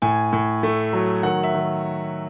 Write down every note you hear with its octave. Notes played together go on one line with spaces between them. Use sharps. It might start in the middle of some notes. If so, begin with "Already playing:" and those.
A2 G#5
A2
A3
F#3
D#3 F#5
E5
D#3